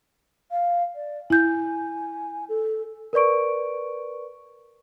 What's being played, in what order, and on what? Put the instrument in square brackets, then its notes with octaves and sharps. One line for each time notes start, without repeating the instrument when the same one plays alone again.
[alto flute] F5
D5
[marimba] E4 G6 [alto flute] G#5
[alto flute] A4
[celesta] A#4 B4 D5 C#6 D7